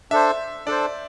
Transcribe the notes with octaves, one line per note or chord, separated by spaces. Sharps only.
D4 A4 C5 E5
D4 A4 C5 D5